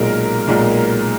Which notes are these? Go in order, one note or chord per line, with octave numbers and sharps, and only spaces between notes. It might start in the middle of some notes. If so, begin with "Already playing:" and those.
Already playing: B1 A#2 G#3 A#4
B1 A#2 G#3